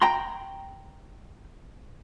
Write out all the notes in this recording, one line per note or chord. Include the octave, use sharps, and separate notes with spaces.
G5 A#5 C6